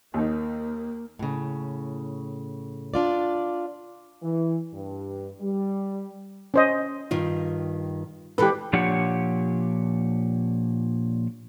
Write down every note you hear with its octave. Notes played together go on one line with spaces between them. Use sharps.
D#2 A#3 D#4
A2 C#3
D4 F4 D5
E3
G2
G3
C#4 C5 D#5
G2 D#3 F4
E3 G#3 G4 A4 B4
A#2 F3 D4 G4 C#5 F#5